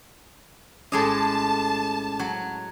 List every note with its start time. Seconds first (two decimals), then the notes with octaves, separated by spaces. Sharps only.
0.92 A#1 A2 G#3 C#4 D#5 A5 D6
2.19 F#3 F#4